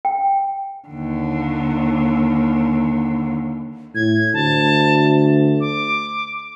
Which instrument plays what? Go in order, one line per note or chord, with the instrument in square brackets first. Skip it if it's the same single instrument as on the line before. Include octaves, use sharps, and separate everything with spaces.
[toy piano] G5
[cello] D#2 D3
[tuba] A2 [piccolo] G#6
[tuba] D2 [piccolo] A5
[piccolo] D6